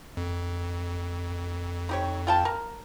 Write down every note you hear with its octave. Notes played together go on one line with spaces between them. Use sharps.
F2
D#4 G4 C#5
F4 G5 A5
A#4